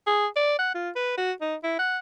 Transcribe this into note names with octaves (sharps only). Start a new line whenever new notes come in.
G#4
D5
F#5
F4
B4
F#4
D#4
E4
F#5